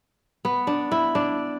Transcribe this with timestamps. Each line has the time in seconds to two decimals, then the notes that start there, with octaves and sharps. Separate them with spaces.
0.45 B3
0.67 D4
0.92 E4
1.15 D4